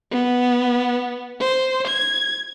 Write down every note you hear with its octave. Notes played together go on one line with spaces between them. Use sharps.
B3
C5
G#6